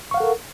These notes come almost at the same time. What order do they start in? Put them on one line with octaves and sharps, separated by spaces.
C#6 F5 F#5 A4 A#4